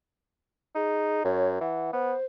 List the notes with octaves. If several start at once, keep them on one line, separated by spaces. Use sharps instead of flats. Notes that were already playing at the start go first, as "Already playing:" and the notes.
D#4 G#4
F#2 C#5
E3 F#5
B3 C5